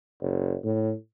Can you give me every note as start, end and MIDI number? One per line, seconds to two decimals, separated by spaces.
0.22 0.55 30
0.64 0.93 45